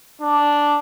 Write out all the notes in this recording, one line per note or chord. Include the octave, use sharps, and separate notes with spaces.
D4